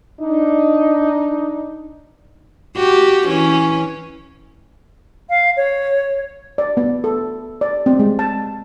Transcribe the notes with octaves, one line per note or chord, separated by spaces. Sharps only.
D4 D#4
F#4 G4
E3 C#4
F5
C#5
D5
B3
A4
D5
C4
G#3
A5